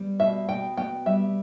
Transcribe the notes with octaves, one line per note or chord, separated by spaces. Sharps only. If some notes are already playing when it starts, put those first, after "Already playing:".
Already playing: G3 B3
B2 E5
B2 G5
B3 G5
G3 E5